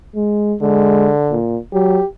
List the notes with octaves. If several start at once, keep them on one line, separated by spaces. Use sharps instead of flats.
G#3
D3 G#3
A#2
F#3 G4